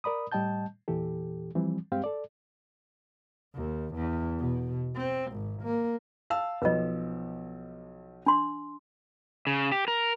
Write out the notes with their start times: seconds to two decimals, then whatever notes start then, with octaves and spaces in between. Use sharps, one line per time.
0.04 A#4 D5 B5 D#6
0.32 A2 G3 D#5 G5 A5 G6
0.88 E2 A#2 E3 G4 A4
1.55 E3 F3 G3 C4
1.92 G2 G#3 C4 G4 F5 G5
2.04 A4 D5
3.55 D#2
3.94 E2
4.39 B2
4.96 C4
5.32 G#1
5.62 A#3
6.30 F5 A5 E6
6.62 B1 F3 B4 D#5
8.26 D4 C6
9.47 C#3
9.72 G4
9.88 A#4